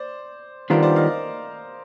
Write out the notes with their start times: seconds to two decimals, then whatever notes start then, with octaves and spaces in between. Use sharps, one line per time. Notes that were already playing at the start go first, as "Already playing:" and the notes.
Already playing: C5 D5
0.70 D#3 G3 B3 D4 F4 A#4 C5
0.83 C5 D5
0.96 D#5 F5